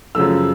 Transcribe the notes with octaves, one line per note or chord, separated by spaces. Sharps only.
F#2 C#3 F3 A3 E6